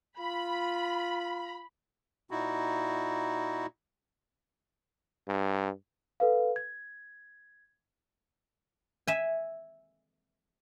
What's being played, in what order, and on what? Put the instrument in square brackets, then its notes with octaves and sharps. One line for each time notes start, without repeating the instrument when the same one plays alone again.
[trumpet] F4 [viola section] B5
[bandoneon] A#2 D#4 E4 F#4
[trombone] G2
[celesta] A4 B4 F5
G#6
[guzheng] E5 G#5